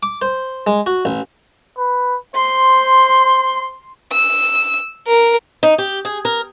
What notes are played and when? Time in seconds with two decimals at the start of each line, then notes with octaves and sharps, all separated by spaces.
0.03 D6
0.22 C5
0.67 G#3
0.86 F#4
1.05 A1
1.78 B4
2.35 C5 C6
4.13 E6
5.07 A#4
5.63 D#4
5.78 G4
6.05 G#4
6.25 A#4